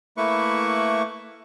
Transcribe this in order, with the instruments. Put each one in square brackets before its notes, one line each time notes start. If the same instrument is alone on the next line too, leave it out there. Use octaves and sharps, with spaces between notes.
[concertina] A3 A#3 E4 B4 C#6